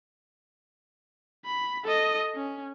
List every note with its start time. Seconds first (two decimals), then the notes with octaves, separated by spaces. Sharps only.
1.45 B5
1.85 A4 D#5
2.35 C#4